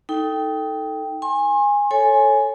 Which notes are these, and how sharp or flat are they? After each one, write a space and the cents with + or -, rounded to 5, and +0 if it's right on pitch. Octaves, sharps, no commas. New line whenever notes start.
D#4 +20 A4 +0 G5 +0
G#5 -15 C6 +40
A4 +0 C#5 -10 G#5 +0